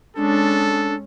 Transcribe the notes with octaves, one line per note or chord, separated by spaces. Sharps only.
G#3 C#4 D4 A4